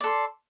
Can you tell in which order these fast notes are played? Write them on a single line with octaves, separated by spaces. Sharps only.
D5 A4 C6